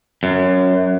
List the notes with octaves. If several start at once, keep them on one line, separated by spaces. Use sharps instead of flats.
F#2